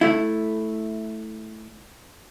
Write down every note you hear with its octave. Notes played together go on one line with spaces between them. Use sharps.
A3 E4